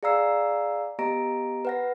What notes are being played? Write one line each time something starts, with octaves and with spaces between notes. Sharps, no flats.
G#4 D5 F5 A#5 E6 C7
B3 G4 D#5 A#5 A#6 D7
B4 F#5 A#6